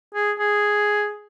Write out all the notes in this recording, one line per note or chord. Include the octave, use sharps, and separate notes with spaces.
G#4
G#4